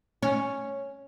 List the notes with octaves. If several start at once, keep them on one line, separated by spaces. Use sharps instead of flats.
C#4